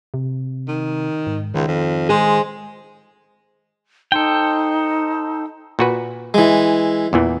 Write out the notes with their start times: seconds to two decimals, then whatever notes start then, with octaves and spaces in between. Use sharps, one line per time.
0.14 C3
0.68 D#3
1.27 G#2
1.54 C#2 D#3
1.68 F2
2.09 G#3 G#4 C5
4.12 D#4 A4 C5 G5
5.79 A#2 F#4 B4
6.34 E3 G#3
7.13 E2 A#2 E3